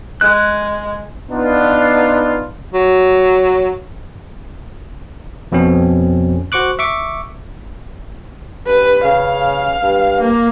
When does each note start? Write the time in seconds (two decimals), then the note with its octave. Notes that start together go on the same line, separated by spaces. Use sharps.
0.21 G#3 F#6
1.30 B3 D4 D#4 F4
2.74 F#3
5.52 F2 B2 C4 C#4
6.52 F#4 C5 C#6 D6 F#6
6.79 E5 C#6 D6
8.67 G2 B4
9.04 C#3 F5
9.83 G2
10.21 A#3